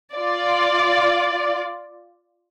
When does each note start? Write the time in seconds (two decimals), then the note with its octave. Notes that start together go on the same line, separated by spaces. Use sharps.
0.14 F4 D5